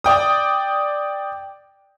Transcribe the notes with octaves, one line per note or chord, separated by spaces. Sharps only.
D5 G5 D#6